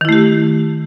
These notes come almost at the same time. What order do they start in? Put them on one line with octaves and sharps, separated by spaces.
D#3 E4 A3 G4